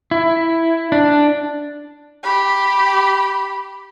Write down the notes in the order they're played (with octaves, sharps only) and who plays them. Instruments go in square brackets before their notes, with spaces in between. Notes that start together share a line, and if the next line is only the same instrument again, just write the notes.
[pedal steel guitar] E4
D4
[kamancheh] G4 B5